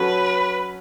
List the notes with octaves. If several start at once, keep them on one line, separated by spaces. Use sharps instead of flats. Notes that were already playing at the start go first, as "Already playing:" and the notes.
Already playing: F#3 C#4 F#4 A4 B4